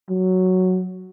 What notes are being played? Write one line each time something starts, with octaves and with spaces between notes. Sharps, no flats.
F#3